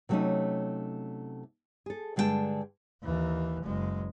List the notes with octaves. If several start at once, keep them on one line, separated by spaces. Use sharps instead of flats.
C3 F#3 A3 C4 C#4 D#4
G#4 A4
G2 D3 G#3 G#4 G5 A5
D#2 E3
F#1 G#3